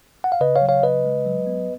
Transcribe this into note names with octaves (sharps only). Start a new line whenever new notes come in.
F#5
F5
C#3 B4 D#5
C#5 F5
F#3
C#5 F5
C#3 B4 D#5
G#3
F#3
B3